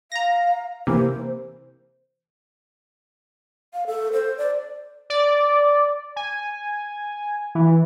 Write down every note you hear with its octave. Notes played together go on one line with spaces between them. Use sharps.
F5 A#5 A#6
C3 E3 A#3 C5
F5
A4
C5
D5
D5
G#5
E3